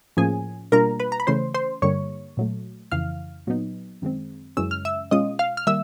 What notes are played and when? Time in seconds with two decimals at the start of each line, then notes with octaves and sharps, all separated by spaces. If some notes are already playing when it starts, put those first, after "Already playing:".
0.17 A2 F3 A#3 C#4 G#4 G#5
0.72 B2 G3 A#3 D4 F4 A#4 A#5
1.00 B4 B5
1.12 A#5
1.20 B5
1.27 C#3 E3 A3 C#4 C5 C6
1.54 C5 C6
1.82 G2 D3 G3 A#3 C#5 C#6
2.37 A#2 F#3 A3
2.92 F2 C#3 E3 F5 F6
3.47 A#2 F#3 B3 D#4
4.02 F#2 D#3 G#3 C4
4.57 F#2 C#3 E3 G#3 C#4 E6
4.71 F6
4.85 E5 E6
5.11 B2 G#3 C#4 F4 D#5 D#6
5.39 F5 F6
5.57 F6
5.67 D#3 G3 A#3 E5 E6